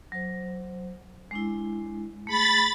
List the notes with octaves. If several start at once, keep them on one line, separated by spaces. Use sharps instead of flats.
F#3 C5
G#3 D4 E4
A3 G#4 B5 A6